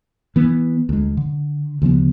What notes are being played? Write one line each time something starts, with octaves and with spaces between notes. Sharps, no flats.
E3 B3
D2 G#3
D3
D2 C#3 F3 B3